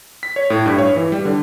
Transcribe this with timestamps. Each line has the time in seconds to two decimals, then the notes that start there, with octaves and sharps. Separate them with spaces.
0.23 B6
0.36 C#5
0.50 A2
0.66 G2
0.78 C#5
0.96 E3
1.12 G3
1.25 D3